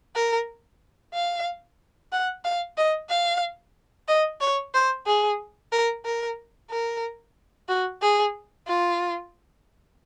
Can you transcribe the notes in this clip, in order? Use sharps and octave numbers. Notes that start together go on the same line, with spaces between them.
A#4
F5
F#5
F5
D#5
F5
D#5
C#5
C5
G#4
A#4
A#4
A#4
F#4
G#4
F4